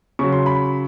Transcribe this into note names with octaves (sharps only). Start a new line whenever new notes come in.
C#3 F#3 C#6
C6
B5